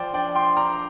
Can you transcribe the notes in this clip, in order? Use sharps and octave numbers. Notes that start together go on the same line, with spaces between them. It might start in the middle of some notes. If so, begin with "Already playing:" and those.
Already playing: F3 C5 D5 G5
D4 D5 G5
G5 C6
D4 A#5 D6